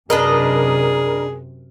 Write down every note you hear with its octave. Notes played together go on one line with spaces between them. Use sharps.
F#2 C3 D4 G#4 A#4 B4 D#5